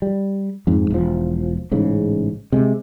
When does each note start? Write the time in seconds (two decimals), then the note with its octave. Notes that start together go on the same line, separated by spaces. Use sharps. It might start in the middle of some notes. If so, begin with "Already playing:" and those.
0.02 G3
0.67 F2 G#2
0.90 E1 F3
1.71 A1 G#2 C#3
2.52 C3 G#3